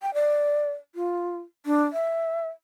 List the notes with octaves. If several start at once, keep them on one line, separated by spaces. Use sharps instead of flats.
G5
D5
F4
D4
E5